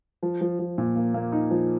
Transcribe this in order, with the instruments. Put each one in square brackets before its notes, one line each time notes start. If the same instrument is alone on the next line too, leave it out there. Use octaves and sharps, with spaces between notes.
[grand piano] F3
F3
F3
A#2
A#3
A#3
D#4
F3